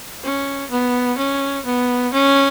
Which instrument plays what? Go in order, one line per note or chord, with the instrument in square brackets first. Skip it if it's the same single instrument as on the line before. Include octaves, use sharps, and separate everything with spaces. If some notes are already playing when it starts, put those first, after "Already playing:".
[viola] C#4
B3
C#4
B3
C#4